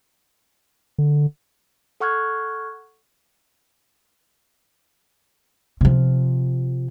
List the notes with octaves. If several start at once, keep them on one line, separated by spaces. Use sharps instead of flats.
D3
A4 F#5 C#6 F6 F#6 G#6
C3 F3